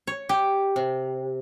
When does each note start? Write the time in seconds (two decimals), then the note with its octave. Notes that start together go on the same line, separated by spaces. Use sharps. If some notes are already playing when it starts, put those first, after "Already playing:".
0.07 C#5
0.29 G4
0.76 C3